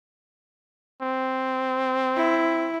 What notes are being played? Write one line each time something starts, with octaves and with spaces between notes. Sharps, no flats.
C4
E4